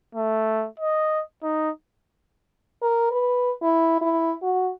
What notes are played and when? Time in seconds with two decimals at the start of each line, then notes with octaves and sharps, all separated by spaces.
0.15 A3
0.80 D#5
1.43 D#4
2.82 A#4
3.11 B4
3.63 E4
4.01 E4
4.42 F#4